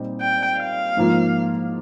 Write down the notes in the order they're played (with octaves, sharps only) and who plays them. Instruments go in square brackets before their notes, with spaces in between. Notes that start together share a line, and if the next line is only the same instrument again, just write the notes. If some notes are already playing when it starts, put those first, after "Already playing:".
Already playing: [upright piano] A#2 G3 C4 D#4
[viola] G5
F5
[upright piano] G#2 F3 A#3 F4